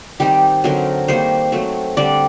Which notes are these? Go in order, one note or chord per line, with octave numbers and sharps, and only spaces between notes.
D#3 G3 C4 D#4 G4
D3 F#3 C4 D#4 A#4
D#3 G3 A#3 D#4 C5
F#3 A3 C4
D3 G3 C4 D5